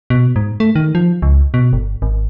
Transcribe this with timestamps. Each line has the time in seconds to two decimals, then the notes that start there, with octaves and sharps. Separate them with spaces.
0.10 B2
0.36 G#2
0.60 A3
0.76 D#3
0.95 F3
1.22 C#2
1.54 B2
1.73 G1
2.02 G#1